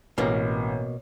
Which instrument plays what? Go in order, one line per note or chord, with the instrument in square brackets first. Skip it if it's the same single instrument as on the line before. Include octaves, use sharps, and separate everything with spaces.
[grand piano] A1 [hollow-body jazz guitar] B2 A#3